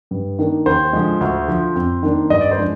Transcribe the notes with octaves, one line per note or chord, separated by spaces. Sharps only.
G2
D#3 A#3 D4
D#2 C5
D3 F3 G#3
D2
D3 F3
F2
D#3 A#3 D4
G2 D#5
D5
C5
F3 G#3 D4